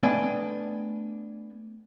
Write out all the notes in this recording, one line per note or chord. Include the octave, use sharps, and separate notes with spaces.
A3 B3 D4 D#5 G5 G#5